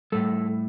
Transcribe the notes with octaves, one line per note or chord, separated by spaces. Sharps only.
A2 G3 A4